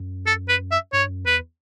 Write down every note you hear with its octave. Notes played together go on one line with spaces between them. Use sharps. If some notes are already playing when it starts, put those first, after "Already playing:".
Already playing: F#2
A4
B4
E5
G2 C#5
F#2
E2 B4